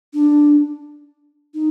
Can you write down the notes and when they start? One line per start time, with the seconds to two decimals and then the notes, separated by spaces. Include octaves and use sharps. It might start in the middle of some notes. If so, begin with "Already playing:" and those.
0.14 D4
1.54 D#4